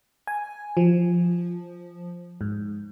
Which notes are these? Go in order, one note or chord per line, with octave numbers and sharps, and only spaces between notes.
G#5
F3
G#2